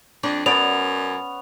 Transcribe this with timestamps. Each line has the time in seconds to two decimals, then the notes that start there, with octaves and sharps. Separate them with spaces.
0.23 F2 D4
0.46 F#2 B3 C#4 D5 F7